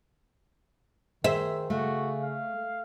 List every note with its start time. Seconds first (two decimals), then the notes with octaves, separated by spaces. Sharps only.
1.24 D#3 G#4 C5 E5
1.70 C#3 A3 F#4
2.23 F5